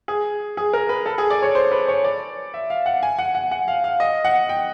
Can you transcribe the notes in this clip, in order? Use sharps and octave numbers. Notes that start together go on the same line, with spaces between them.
G#4
G#4
A#4
B4
A4
G#4
D5
C#5
C5
B4
C#5
D5
E5
F5
F#5
G#5
F#5
F#5
F#5
F5
F5
D#5
F#5
G5